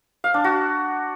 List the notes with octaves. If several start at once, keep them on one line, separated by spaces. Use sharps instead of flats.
F5
D4
F#4